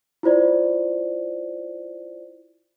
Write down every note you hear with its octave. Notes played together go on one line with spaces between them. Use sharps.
E4 F4 C5 D5